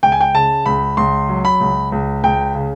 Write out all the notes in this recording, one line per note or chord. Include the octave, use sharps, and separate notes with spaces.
C#2 G5
G#5
G5
C#3 A5
C#2 B5
C#2 C6
F#3
B5
C#2
C#2
C#2 G5
C#3